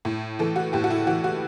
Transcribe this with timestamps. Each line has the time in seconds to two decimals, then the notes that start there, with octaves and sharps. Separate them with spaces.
0.05 A2
0.39 E3 A4
0.56 F#4
0.73 A2 G4
0.84 F#4
0.90 E4
1.07 E3 F#4
1.24 F#4